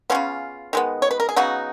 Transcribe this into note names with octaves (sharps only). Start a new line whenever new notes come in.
F3 B3 C#4 F4
C#3
D#3 G#3 B3
C#5
B4
A#4
G#4
C#3 F#3 B3 D#4 F#4